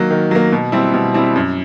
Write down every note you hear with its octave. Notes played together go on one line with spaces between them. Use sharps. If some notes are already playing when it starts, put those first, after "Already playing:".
Already playing: D#3 F#3 A#3
D#3
F#3 A#3
B2
G3 C4 E4
B2
G3 C4 E4
F#2